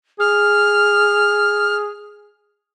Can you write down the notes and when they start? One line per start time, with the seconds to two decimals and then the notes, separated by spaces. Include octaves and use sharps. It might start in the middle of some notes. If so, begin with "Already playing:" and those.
0.20 G#4 F6